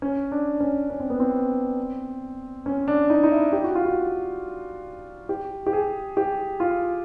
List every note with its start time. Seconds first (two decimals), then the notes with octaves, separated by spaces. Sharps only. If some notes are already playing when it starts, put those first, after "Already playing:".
0.02 C#4
0.32 D4
0.60 C#4
0.90 C#4
1.00 C4
1.10 B3
1.20 C4
2.66 C#4
2.88 D4
3.10 D#4
3.23 D#4
3.32 E4
3.53 G4
3.64 F#4
3.75 F4
3.85 F#4
5.29 G4
5.67 G4
5.73 G#4
6.17 G4
6.60 F4